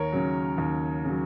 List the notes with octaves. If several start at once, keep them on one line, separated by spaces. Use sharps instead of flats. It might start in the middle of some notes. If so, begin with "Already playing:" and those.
Already playing: D#2 A#4 C#5
C#3 F#3
D#2
C#3
F#3